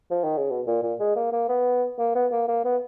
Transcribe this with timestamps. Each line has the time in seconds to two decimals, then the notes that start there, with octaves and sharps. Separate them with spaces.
0.11 F3
0.24 D#3
0.37 C#3
0.50 B2
0.67 A#2
0.83 A#2
1.00 G#3
1.16 A#3
1.32 A#3
1.49 B3
1.99 A#3
2.15 B3
2.31 A#3
2.48 A#3
2.64 B3